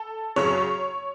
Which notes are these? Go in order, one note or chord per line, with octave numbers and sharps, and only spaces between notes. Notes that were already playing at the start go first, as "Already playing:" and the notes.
Already playing: A4
F#2 C#3 F#3 C#5